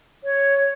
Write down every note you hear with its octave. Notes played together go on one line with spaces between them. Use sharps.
C#5